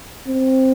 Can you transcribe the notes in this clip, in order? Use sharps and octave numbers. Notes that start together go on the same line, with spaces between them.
C4